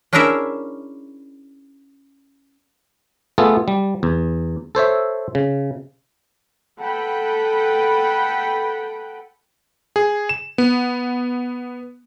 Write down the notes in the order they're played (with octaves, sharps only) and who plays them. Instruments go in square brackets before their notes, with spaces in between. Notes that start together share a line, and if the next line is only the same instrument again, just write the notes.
[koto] C#4 D4 E4 G#4 A#4 E5
[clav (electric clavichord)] A3 B3 F4 G#4 A4
G3
E2
A4 C5 C#5 E5
C#3
[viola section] A4 B4 F#5 G5 B5
[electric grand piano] G#4
E7
B3